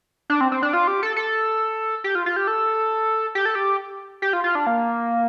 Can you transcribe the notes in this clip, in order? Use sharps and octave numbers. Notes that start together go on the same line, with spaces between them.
D4
C4
C4
D4
F4
G4
A4
A4
G4
F4
F4
G4
A4
G4
A4
G4
G4
F4
F4
D4
A#3